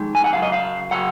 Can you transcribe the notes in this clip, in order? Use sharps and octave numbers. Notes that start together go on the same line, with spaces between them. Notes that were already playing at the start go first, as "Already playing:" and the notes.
Already playing: F2 D#3 G#3
G#5
F#5
F#2 C#3 F#3 F5
D#5
F5
C#3 F#3 F#5